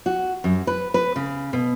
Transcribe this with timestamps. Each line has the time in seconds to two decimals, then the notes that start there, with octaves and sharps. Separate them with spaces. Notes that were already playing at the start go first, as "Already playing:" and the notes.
0.06 F#4
0.44 F#2
0.67 B4
0.94 B4
1.16 C#3
1.53 B2